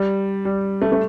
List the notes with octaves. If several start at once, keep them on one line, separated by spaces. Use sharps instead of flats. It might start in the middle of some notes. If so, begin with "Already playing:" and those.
Already playing: G3
G3
A3
A3